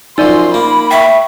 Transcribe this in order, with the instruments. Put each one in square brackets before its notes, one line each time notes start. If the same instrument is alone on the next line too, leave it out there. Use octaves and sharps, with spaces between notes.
[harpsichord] F#2 F3 [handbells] D#4 D5 [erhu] C6
[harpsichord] A#3 [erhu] B5
[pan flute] E5 [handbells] G5 C#6